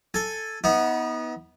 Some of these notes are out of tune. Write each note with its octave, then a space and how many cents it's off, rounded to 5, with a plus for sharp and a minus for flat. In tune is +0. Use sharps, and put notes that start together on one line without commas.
A4 +0 G#5 +0
B3 -5 D#4 +40